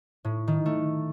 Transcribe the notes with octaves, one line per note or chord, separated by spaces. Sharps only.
A2
D#3
A3